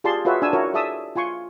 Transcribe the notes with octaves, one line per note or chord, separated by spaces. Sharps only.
F4 G4 G#4 D5 A5 C6
F4 F#4 G#4 B4 C#5 E5
D4 G#5 E6
E4 F#4 A#4 C#5
G#4 D5 E5 A5 D#6 E6
F4 G#5 C6 C#6